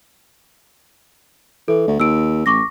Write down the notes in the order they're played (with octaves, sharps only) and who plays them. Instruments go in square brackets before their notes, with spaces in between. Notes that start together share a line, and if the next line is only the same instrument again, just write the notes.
[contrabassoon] E3 [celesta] A4
[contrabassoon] D2
[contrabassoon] D#2 [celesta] E6 D7
[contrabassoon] A1 [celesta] C#6 D6 A#6